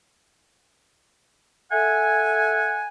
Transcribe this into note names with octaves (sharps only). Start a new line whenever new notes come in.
A4 E5 F#5 G#5